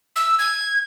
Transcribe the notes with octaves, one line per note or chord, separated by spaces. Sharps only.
E6
G#6